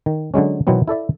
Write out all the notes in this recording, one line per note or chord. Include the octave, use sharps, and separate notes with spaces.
D#3
D3 F#3 G#3 C#4
B2 D#3 E3 F#3 B3 C4
E4 A4 D5 E5